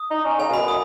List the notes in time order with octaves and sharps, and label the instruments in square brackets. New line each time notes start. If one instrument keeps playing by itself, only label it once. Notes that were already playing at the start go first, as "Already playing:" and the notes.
Already playing: [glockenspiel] D#6
[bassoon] D#4
C#4
[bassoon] C#3 [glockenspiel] G#5
[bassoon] B2
[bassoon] F#2 [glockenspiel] B5
[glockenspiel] D#6